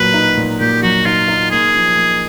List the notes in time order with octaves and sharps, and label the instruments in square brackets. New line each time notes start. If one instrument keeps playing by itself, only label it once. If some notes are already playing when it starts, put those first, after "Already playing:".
Already playing: [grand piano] A#2 F#3 [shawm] B4
[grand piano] D#4
A#2
[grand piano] A#2 [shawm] G4
[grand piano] F#3 [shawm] F#4
[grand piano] D#4 [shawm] F4
[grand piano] D#4
[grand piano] A#3 [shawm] G#4
[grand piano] F3
A#3